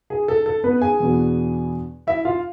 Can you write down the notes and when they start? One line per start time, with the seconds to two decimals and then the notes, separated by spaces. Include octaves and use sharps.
0.10 G#4
0.28 A4
0.46 A4
0.64 B3 B4
0.82 G#4 G#5
1.00 E2 B2 B3 D4
2.07 E4 E5
2.25 F4 F5